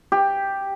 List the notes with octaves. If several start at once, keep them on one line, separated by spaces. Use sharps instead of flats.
G4